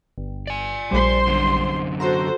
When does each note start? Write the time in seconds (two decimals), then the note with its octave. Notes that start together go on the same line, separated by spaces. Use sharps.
0.18 G1
0.47 D5 G#5
0.91 A#1 G3 C5 C6
1.27 F#2 D3
2.00 F#4 A4 C5 A#5 C6 E6